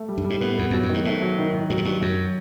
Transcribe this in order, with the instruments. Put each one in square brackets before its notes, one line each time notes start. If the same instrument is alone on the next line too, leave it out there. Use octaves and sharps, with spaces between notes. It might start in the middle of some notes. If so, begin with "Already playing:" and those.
Already playing: [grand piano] A3
G3
[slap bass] G2
[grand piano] G3
[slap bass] G#2
[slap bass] A2 [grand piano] B3
[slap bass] E2 [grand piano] B3
[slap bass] F2 [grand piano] F#3
[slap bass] F#2
[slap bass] G2 [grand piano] D#3
[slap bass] G#2 [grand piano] A3
[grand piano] F#3
D#3
D#3
[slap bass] G2 [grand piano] F#3
[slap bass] G#2
[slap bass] G2 [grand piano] F#3
[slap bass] F#2 [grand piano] F#3